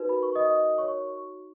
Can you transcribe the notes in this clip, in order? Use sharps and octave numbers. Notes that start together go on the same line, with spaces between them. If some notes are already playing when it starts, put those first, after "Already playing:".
Already playing: D#4 F#4 A#4 B4
B5
C#6
D#5 D#6
C#5 C#6